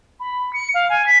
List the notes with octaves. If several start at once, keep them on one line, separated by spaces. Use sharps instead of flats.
B5
C#7
F5
G#5
B6